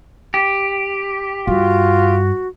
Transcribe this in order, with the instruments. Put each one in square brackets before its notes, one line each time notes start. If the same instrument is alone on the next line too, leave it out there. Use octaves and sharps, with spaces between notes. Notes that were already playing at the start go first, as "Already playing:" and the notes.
[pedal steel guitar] G4
[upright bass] G2 [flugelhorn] F4 [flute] F#4